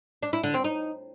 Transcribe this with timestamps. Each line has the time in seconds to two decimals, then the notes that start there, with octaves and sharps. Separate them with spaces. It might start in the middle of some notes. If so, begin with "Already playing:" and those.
0.23 D4
0.33 E4
0.44 D3
0.54 C4
0.64 D#4